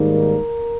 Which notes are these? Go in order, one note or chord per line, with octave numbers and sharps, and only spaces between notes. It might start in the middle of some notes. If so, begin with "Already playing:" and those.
Already playing: G#2 D#3 G3 A#3
A#4